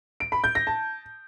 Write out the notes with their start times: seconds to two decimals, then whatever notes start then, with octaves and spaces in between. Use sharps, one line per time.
0.20 D7
0.32 B5
0.44 G6
0.55 A#6
0.67 A5